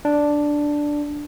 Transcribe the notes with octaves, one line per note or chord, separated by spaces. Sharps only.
D4